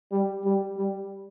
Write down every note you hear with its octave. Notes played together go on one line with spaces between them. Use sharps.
G3
G3
G3